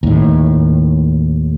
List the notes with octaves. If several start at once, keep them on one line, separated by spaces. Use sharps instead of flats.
D#2 A2